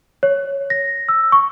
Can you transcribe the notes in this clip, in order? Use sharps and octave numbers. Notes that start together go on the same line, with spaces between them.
C#5
A#6
E6
C#6